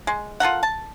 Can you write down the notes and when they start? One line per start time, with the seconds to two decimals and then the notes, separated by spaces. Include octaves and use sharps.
0.07 G#3
0.40 F4 A4 A#4 F#5
0.63 A5